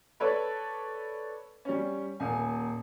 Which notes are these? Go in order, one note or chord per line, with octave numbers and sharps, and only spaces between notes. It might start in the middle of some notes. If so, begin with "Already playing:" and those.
A4 B4 C#5 D5 B5
G3 C#4
D#1 A#3 G#5